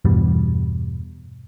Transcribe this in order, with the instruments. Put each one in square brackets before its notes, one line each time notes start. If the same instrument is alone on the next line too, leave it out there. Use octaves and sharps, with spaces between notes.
[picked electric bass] E2 G2 B2 G3